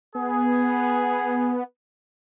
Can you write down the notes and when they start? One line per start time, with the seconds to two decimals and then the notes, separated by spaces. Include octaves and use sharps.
0.15 B3 G#4